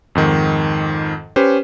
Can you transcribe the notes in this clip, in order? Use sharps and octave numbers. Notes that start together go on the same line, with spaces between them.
F2 G#2 D#3
C#4 G4 B4 C5